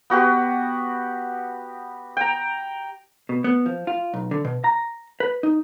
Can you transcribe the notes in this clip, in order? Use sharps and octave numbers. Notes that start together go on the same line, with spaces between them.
B3 F#4 G4 B4
G5 A#5
B2
B3
F3
F4
B1
D3
B2
A#5
B4
D#4